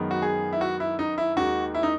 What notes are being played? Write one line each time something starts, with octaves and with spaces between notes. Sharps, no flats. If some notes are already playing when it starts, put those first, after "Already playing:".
Already playing: F#2 D#3 G#3 B3
F#4
G#4
E4
F#4
E4
D#4
E4
D#2 D#3 G#3 F#4
E4
D#4